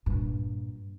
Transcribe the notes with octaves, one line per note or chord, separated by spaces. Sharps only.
G2 A#2